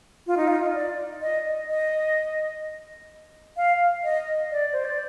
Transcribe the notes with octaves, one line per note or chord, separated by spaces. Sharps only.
F4
D#4
F4
D5
D#5
D#5
F5
D#5
D5
C5
D5